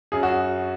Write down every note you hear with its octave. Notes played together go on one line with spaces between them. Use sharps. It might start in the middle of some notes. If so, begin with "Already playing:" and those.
F#2 G#4
F#4